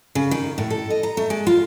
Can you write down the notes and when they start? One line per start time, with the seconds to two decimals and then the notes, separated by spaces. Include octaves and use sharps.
0.15 C#3
0.31 D#3
0.58 A2
0.70 A4
0.90 D#5
1.03 A#5
1.17 A3
1.30 G#3
1.47 F4